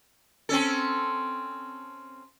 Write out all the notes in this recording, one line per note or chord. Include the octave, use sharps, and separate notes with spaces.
C4 C#4 A4